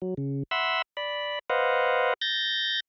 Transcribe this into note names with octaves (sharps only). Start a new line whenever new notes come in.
F#3
C#3
E5 F#5 B5 C6 E6
D5 B5
B4 C5 D#5 F5 F#5
G6 A6 A#6